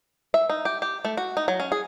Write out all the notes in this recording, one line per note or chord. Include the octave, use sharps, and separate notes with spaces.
E5
D#4
G4
G4
A3
F#4
D#4
F#3
C#4
G#4